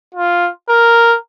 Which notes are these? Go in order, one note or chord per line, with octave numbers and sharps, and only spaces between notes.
F4
A#4